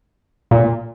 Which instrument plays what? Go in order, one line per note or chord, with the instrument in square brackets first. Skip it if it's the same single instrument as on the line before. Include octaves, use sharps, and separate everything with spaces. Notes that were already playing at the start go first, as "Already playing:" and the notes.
[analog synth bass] A#2